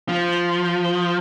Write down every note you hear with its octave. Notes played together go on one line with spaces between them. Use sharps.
F3